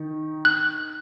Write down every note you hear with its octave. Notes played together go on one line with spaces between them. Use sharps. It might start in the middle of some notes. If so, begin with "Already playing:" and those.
Already playing: D#3 D#4
F#6